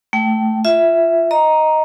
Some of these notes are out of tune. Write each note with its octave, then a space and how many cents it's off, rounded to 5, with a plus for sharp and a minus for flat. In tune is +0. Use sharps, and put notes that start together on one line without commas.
A3 +0 G5 -20
F4 -15 E5 +0
D#5 +0 A#5 +5